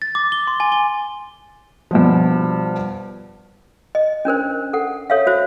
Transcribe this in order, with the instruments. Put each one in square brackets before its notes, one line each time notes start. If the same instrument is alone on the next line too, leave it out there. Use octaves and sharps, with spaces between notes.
[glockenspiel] A6
D6
G7
C6
G#5
G7
[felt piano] G2 B2 F3
[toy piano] D#5
C#4 D4 A#4 C5
A4 F#5
A4 C#5 E5 F5
F#4 C5 E5 F5